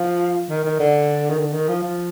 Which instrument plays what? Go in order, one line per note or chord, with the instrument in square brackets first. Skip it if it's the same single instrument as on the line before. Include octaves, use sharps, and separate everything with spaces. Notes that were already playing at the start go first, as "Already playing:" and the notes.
Already playing: [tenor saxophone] F3
D#3
D#3
D3
D#3
D3
D#3
F3
F3